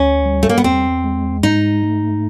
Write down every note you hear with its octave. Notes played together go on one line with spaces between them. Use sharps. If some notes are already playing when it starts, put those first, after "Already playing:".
Already playing: D2 C#4
G3
A3
A#3
B3
E2 C4
G#3
G#2 D#4
A3